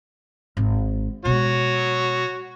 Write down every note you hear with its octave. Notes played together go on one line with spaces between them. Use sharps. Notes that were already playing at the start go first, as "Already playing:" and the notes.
G#1
B2 G#3 F#4 C#5